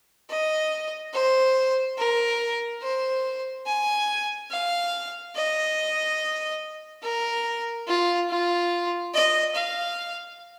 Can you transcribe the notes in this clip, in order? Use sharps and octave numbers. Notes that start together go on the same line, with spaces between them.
D#5
C5
A#4
C5
G#5
F5
D#5
A#4
F4
F4
D#5
F5